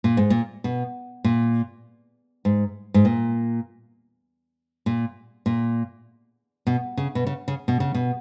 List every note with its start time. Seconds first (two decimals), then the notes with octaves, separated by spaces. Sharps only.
0.04 A#2
0.17 G#2
0.30 A#2
0.64 B2
1.24 A#2
2.45 G#2
2.94 G#2
3.05 A#2
4.86 A#2
5.46 A#2
6.67 B2
6.97 C#3
7.15 B2
7.27 C#3
7.48 C#3
7.68 B2
7.80 C#3
7.94 B2